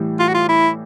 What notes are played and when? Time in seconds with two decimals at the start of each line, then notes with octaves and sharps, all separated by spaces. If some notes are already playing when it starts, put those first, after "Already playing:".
Already playing: A2 E3 G3
0.19 F4
0.28 F#4
0.34 F4
0.49 E4